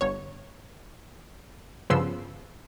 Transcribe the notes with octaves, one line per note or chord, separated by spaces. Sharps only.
G1 C#5
G2 C#3 F3 B3 C6 E6